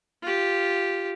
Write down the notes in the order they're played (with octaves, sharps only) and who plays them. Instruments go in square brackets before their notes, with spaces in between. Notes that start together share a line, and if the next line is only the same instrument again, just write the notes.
[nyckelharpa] F4 G4